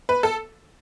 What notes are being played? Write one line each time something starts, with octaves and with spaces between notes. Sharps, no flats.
B4
A4